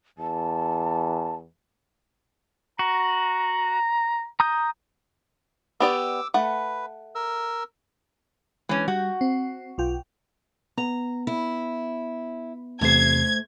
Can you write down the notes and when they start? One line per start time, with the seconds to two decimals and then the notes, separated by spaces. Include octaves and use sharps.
0.18 E2 A5
2.79 F#4 A#5
4.40 A#5 D#6 G6
5.80 B3 G4 D5 D6 E6
6.34 A3 B4 F#5
7.15 A#4 E6
8.69 E3 G#3 C#4
8.88 G3 F#4
9.21 C4
9.78 B1 F4 G5
10.78 B3 A#5
11.27 E4
12.81 E2 C3 A3 C5 G#6 C7